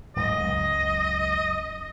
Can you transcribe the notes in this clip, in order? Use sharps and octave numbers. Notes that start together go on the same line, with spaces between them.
D1 G#2 F#3 D#5
C#2 F#2 G#3